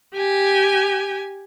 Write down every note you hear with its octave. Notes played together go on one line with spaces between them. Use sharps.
G4 G#5